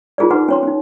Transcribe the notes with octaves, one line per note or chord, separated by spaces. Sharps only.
D#4 F4 G#4 A#4 D5
D4 D#4 B4 F#5 C6 D6
C#4 C#5 C6
C#4 D#4